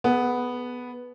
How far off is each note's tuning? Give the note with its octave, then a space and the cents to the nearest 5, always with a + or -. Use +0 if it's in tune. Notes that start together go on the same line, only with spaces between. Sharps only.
B3 +0 G#4 +40 B4 +0